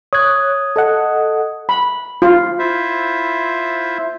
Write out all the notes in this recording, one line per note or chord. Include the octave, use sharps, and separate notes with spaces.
C#5 D#6 F#6 G#6
A4 D#5 F#5
B5
F4
E4 F4 C5 E5